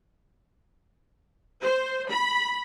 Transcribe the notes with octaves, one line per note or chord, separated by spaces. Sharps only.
C5
B5